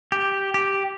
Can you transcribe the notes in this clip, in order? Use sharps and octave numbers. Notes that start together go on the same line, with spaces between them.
G4
G4